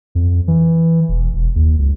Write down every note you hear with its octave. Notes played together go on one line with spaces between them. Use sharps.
F2
E3
E1
E1
D#2
C#2